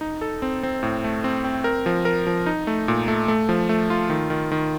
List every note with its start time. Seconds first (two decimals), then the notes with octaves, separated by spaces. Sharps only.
0.01 D#4
0.21 A4
0.42 C4
0.63 C4
0.83 A2
1.04 A3
1.24 C4
1.44 C4
1.64 A#4
1.86 F3
2.05 A#4
2.27 F3
2.46 D#4
2.67 A3
2.88 A#2
3.08 A3
3.28 A3
3.49 F3
3.69 A3
3.90 F4
4.10 D#3
4.30 D#3
4.52 D#3